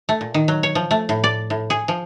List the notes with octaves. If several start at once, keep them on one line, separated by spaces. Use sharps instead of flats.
A3
A#2
D#3
F#3
C#5
F3
A3
A2
D5
A2
G#4
F3